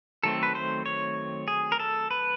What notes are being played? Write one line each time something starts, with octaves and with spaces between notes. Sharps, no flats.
D#3 F#3 A3 C4 A4
B4
C5
C#5
G#4
A#4
A4
B4